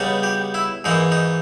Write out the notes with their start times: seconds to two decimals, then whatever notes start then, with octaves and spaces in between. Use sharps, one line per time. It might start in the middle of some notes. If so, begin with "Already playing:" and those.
Already playing: C#3 G3 B3 D#4
0.23 G4
0.54 E4
0.84 G#2 E3 A#3 D#4
1.12 D#4